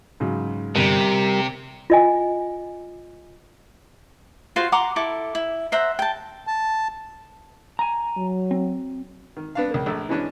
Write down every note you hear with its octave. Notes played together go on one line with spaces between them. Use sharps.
G#2 C#3 F#3
G1 C3 G3 A#4
B6
F4 D#5 G#5
F4 F#4 C5 F5
F#5 A#5 C6 D6
E4 A4 D6
E4
C5 E5 F#5 A#5
G5 A5
A5
G#5 A#5
F#3
C4
D#3
B3 D4 F5
C#2 A#3
A#1 A3 E6
E3 G#3 B3 C#4 D4